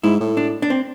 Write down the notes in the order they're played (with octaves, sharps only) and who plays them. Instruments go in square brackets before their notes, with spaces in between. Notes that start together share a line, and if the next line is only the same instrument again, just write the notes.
[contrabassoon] G#2 [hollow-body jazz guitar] E4
[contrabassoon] A2
[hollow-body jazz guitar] D4
D4
C4